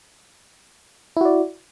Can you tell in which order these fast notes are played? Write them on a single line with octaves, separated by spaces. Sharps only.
E4 F#4 D5